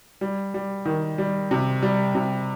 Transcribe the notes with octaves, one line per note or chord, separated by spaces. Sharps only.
G3
G3
D#3
G3
C3
G3
C3